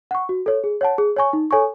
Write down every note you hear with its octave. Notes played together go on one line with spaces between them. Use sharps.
F#5 C#6
F#4
A4 C#5
G#4
C#5 F#5 A5
G#4
C#5 G#5 C#6
D#4
A4 C#5 G#5 C#6